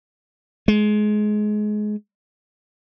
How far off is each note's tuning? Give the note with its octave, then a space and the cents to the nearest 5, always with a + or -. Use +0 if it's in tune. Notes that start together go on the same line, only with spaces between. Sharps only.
G#3 +25